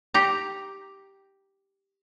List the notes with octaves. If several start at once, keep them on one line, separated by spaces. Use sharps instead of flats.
G4 A#5